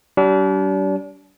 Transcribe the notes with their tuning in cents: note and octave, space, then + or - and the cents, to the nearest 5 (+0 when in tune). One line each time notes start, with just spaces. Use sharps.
G3 -40 D4 -40